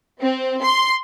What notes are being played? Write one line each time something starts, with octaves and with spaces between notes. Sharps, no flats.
C4
C6